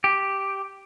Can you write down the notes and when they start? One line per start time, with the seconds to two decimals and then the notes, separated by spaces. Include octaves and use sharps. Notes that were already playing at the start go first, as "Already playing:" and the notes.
0.04 G4